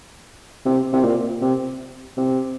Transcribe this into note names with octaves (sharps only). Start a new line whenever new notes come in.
C3
C3
A#2
C3
C3